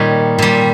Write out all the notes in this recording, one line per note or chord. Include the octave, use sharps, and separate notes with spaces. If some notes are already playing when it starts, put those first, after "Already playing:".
Already playing: A#2 D#3 G3 C#5 D#5
A#2 G3